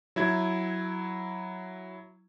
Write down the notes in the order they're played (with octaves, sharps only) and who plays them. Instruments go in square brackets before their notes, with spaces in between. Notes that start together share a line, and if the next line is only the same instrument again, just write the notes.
[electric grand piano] F#3 E4 G#6